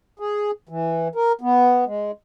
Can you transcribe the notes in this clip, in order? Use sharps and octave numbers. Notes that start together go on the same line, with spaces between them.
G#4
E3
A#4
B3
G#3